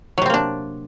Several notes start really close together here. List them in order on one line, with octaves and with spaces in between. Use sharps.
F#3 C3 C4 A#3 D4